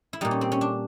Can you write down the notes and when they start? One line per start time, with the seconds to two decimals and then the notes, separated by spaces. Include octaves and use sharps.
0.13 E4
0.21 A#2 G3 D#4
0.31 C#4
0.41 C4
0.52 C#4
0.61 D4